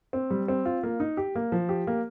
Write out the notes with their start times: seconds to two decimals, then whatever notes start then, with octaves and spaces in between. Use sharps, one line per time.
0.13 C4
0.30 G3
0.48 C4
0.65 F4
0.83 A#3
1.00 D#4
1.17 G4
1.35 A#3
1.52 F3
1.69 G4
1.87 A#3